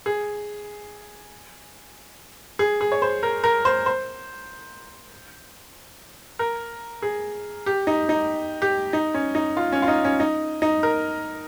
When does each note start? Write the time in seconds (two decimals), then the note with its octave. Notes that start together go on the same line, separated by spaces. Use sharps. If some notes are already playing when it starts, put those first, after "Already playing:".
0.06 G#4
2.59 G#4
2.81 G#4
2.92 C#5
3.02 C5
3.23 A#4
3.44 A#4
3.65 C5
3.86 C5
6.39 A#4
7.02 G#4
7.66 G4
7.87 D#4
8.09 D#4
8.62 G4
8.93 D#4
9.14 C#4
9.35 D#4
9.57 F4
9.72 C#4
9.82 F4
9.88 D#4
10.05 C#4
10.20 D#4
10.62 D#4
10.83 A#4